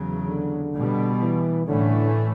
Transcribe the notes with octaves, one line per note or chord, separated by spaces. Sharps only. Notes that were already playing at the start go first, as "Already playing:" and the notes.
Already playing: E2 C#3 F#3
D3
B2 G3 B3
E3
A2 D3 E3 A3 C#4